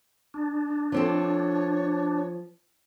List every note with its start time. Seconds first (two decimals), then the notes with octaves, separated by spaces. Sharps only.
0.34 D4
0.92 F3 C4 A4 C#5